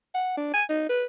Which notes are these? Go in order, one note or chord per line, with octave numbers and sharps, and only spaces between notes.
F#5
D4
G#5
D#4
B4